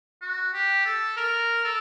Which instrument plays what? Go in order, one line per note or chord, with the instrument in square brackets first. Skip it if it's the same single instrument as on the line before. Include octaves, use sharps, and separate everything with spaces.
[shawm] F#4
G4
A4
A#4
A4